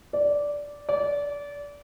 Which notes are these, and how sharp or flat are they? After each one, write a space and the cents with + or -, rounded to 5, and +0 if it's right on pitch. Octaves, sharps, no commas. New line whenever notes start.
D5 -10
D5 -25